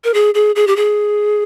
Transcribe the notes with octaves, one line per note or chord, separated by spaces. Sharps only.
A#4
G#4
G#4
G#4
G4
G#4